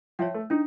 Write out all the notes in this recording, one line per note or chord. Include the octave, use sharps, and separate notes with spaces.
F3 C#5 E5 G5
A3
D4 D#4